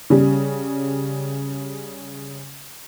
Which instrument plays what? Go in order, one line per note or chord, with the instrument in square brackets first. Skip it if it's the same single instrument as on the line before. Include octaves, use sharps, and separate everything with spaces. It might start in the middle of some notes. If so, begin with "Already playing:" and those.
[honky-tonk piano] C#3 G3